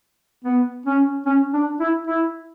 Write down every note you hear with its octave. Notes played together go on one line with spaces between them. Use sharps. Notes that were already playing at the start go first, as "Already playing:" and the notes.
B3
C#4
C#4
D4
E4
E4